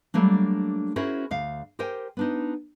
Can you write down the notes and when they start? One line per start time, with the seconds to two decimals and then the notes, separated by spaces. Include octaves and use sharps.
0.14 F#3 G3 A3 A#3 D4
0.96 C#4 E4 F#4 G#4 A#4 C5
1.31 D2 F5
1.79 G4 A#4 C5 G5 G#5
2.17 B3 D4 D#4